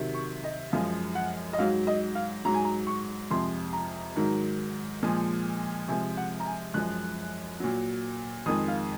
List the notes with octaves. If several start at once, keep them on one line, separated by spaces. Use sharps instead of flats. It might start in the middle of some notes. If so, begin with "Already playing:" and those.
Already playing: C3 D#3 F#3
C#6
D#5
F#2 F3 G#3 F5
F#5
D#5
G#2 F#3 F5
D#5
F5
G#2 F#3 A#5
G#5
A#5
C#6
F2 C3 F3 G#3 C6
A#5
G#2 D#3 F#3
A#2 F3 G#3
C3 F3 G#3 G#5
F#5
A#5
G#5
F#2 F3 G#3 F#6
A#2 F#3
F2 D#3 G#3 D#6
F5